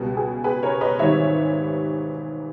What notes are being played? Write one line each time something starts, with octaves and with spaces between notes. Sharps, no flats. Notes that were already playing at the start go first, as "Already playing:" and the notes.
Already playing: C#2 B2 G3
G#4
G#4 B4
A#4 C#5
B4 D#5
G#1 G#2 E3 G3 C#5 E5